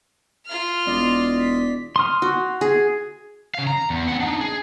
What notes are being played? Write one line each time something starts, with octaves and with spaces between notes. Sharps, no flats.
F4 F6
E1 D5 D#5 C6
B6
C6 D#6 F6
F#4
G#4
C#3 F5
A#5
E2
C4 F#5
D4 D#4
G#4